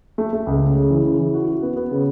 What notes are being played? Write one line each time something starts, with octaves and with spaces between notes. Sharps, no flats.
A3
A3
C#2
C#3
C#3
E3
C#3
E3
F#4
F#4
B3
B3
C#3